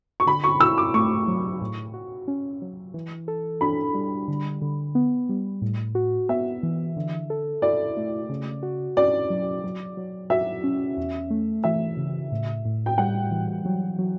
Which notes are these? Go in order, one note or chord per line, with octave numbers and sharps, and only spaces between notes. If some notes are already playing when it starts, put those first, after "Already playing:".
C#6
D3 B5
C#6
E4 E6
D6
A3 C#6
F#3
A2
F#4
C#4
F#3
E3
A4
D4 B5
G3
D3
D3
B3
G3
A2
F#4
B3 E5
E3
D3
A4
E4 D5
A3
C#3
F#4
C#4 D5
F#3
F#3
F#3
F#4 E5
C#4
E2
A3
E3 E5
C#3
A2
A2
G5
G3 F#5
E3
F#3
F#3